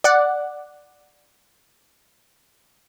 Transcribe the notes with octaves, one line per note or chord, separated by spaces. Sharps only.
D5 F#5